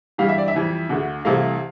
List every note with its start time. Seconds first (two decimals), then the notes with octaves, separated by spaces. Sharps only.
0.18 G2 E3 G3 F5
0.29 E5
0.38 D5
0.48 E5
0.54 F2 E3 G3
0.89 D2 D3 A3
1.25 C2 C3 E3 A3 F5